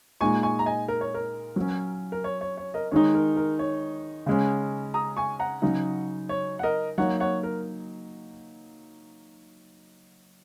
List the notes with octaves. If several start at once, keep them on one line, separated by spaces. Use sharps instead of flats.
A#2 G#3 D#4 G#5 C#6
G#5 C#6
A#5
D#5 G#5
A#4
C#5
A#4
F#3 C#4
A#4
C#5
C#5
C#5
A#4 D#5
D#3 G#3 D#4 C#5
A#4
A#4
C#5
C#3 G#3 C#4
A#5 D#6
G#5 C#6
F#5 A#5
C#3 F#3 D#4
C#5
F#5
A#4 D#5
F#3 A#3 D#4 C#5 F#5
C#5 F#5
A#4